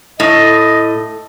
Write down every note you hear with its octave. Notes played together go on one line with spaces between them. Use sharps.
A2 D#5